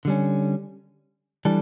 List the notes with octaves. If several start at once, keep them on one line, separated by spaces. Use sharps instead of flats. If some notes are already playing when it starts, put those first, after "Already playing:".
D3 G3 C#4
E3 G3 D4 A4